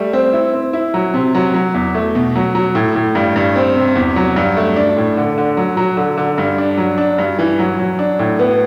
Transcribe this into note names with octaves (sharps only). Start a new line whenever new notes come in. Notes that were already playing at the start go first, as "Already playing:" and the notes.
Already playing: G3 A3
C4
E4
C4
E4
F#3
C3
F#3
F#3
E2
A3
B2
F#3
F#3
A2
A2
G2
G2
C4
C3
E2
F#3
G2
A3
D4
A2
D3
D3
F#3
F#3
D3
D3
G2
D4
F#3
D4
G2
E3
F#3
F#3
D4
A2
B3